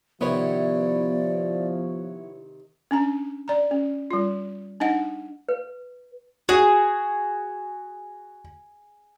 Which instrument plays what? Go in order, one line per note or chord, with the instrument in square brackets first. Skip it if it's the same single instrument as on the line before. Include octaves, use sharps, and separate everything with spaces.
[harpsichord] C3 D#3 [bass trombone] F3 [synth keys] B3 E4 C#5 [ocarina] D5
[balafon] C#4 D4 A#5
D5 A#5
C#4
G3 F4
D4 D#4 D#5 F#5
[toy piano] B4
[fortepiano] F#4 [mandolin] G#4